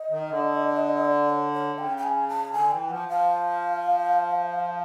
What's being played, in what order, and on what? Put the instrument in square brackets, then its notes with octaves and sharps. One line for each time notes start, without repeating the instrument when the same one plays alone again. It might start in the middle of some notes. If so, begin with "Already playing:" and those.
Already playing: [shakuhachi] D#5
[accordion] D#3
D3
[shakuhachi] D5
C#5
C#5
[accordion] C#3 [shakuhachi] G5
[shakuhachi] G5
G#5
A5
[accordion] D3 [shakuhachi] G#5
[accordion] E3 [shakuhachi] G5
[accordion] F3 [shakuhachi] F#5
[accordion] F3 [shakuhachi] F5